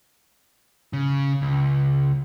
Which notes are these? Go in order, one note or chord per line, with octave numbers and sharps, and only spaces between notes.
C#3
C#2